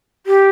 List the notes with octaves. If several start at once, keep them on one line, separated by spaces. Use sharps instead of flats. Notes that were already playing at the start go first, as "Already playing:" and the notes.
G4